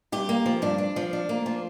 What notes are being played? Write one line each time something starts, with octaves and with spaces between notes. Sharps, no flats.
G2 G4
A#3
F3
G2 D4
D4
F3
D4
A#3
F3